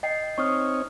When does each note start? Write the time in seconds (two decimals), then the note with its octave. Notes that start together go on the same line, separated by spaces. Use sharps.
0.03 D#5 G5 C7
0.38 C4 D#4 C#5 C#6 D#6 F6